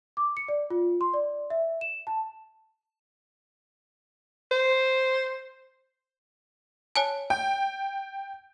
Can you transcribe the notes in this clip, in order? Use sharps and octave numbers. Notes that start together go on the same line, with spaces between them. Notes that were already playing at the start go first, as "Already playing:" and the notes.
D6
C#7
D5
F4
C6
D5
E5
E7
A5
C5
C#5 G#5 A5
G5